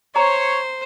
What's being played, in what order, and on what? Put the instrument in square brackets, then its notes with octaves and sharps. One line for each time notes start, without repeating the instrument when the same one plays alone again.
[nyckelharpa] C5 [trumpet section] C#5 [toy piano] A#5